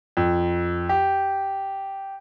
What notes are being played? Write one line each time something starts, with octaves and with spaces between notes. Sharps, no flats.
F2
G4